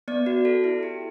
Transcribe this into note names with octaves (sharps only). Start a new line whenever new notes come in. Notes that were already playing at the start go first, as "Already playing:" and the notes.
B3 D5
F#4
A4
E4
G4